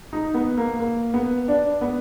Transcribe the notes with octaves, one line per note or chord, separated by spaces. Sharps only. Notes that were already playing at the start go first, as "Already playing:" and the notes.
D#4
B3
A#3
A#3
B3
D4
B3